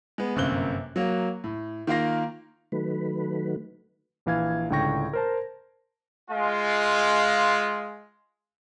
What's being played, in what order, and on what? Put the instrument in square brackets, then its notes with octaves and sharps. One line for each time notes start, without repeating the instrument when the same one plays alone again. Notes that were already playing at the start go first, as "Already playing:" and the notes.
[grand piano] G#3 B3
G1 F#2 C3 A#3 F#6 G7
F#3 A#3
A2
D#3 A#3 F4 F5 A#6
[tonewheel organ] D#3 F#3 A3 B4
[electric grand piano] A#1 E3 F5 G#6
C#2 A2 D3 G5 C#6 A#6
A#4 C5 A5
[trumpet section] G#3 F4